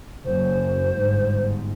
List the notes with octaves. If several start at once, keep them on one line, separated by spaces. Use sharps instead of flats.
F#1 F#2 C5
G1 G#2